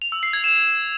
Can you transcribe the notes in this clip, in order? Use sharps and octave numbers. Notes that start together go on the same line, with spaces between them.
F7
E6
C7
G#6
E7